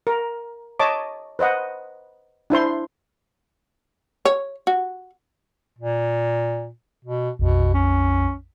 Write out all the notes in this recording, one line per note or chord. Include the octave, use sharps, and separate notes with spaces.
A#4
C#5 D#5 A5 D6
B4 C5 D#5 F#5
D4 E4 C5 C6
C#5
F#4
A#2
B2
A#1 F2 B2
C#4